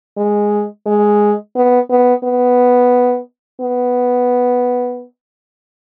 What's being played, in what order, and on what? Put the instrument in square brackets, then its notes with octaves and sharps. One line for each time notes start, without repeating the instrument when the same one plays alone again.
[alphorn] G#3
G#3
B3
B3
B3
B3